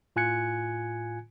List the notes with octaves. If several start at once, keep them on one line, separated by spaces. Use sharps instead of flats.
A2 F4 G#5 F#6 G#6 C#7